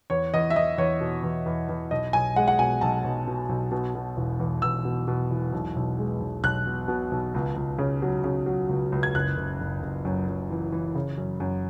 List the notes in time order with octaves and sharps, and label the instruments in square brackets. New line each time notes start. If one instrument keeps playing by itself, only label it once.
[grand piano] E2 C#5
E2 D#5
E5
E2 D#5
E2 C#5
B2
E2
E2
E2
B1 D#5
B1 G#5
G#3 F#5
F#5
B2 G#5
B1 A5
B1
B2
B1
B2
B2
E1
E2
E2 E6
B2
B2
E1
B1
B1
G#3
B1
B1 F#6
B2
B2
B1
C#2
C#2
C#3
F#3
C#3
F#3
C#2
C#2
G#6
F#1 F#6
F#1
F#1
F#1
F#2
F#2
E3
E3
C#3
F#2
F#2